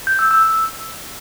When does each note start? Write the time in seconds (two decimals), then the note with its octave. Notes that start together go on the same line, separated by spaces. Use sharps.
0.07 G6
0.19 E6
0.31 E6